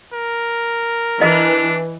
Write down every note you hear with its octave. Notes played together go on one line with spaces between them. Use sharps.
A#4
E3 D4 D#5